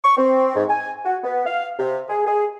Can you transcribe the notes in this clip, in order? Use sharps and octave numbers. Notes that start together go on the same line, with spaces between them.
C#6
C4
G#2
G#5
F#4
B3
F5
C3
G#4
G#4